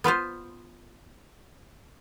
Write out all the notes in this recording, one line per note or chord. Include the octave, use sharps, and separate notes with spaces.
B3 F4 B4 C5